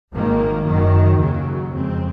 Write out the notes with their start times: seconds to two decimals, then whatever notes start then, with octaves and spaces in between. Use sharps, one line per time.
0.12 G#1 G#2 D#3 A#3
0.65 F#1 F#2 D#3 F#3
1.18 D#2 C#3 F#3
1.72 F2 C#3 G#3 C4